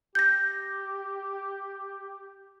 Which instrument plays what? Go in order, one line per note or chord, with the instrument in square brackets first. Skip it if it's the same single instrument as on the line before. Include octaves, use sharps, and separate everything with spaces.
[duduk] G4 [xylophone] G6 A#6